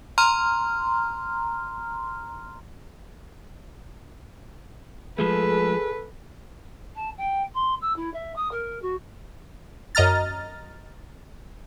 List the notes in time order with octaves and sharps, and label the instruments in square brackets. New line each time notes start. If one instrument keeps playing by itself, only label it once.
[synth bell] A#5 C6 F6
[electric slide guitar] F3 G#3 A3 [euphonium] G#4 [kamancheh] A4 B4
[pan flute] A5
G5
C6
E6
E4
E5
D#6
A#4
F#4
[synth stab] F#2 D#5 A#5 F6 A6